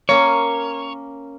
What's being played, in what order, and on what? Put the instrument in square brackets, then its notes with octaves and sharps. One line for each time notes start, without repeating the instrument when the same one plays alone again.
[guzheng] A#3 C#4 [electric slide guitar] C#5